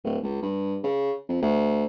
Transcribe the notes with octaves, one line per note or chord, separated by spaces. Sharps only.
D1
C#2
G2
C#3
F2
D2